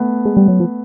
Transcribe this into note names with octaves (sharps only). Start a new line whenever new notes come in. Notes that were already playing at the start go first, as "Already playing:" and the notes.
Already playing: A3 B3
G#3
G3
F#3
F3